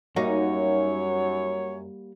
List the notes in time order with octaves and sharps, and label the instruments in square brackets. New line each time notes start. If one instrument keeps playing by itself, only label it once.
[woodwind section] F#2 [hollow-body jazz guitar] G3 A#3 F#4 [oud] D#4 [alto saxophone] C#5